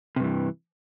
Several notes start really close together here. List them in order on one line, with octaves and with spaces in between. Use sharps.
C3 G2 E3